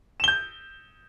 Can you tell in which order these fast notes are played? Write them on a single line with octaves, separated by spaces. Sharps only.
E7 G7 G6